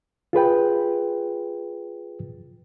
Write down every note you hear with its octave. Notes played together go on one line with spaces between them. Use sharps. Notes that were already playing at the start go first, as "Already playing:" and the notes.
F4 G#4 B4 G5